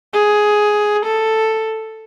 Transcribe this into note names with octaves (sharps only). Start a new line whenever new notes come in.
G#4
A4